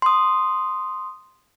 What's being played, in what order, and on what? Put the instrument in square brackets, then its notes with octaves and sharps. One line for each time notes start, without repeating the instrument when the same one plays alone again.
[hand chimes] C6 D#6